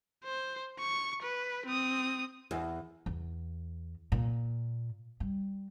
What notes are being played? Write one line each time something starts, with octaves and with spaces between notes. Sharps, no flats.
C5
C#6
B4
C4 D#6
E2
E2
A#2
G3